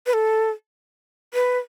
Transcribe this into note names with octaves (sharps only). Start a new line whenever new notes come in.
B4
A4
B4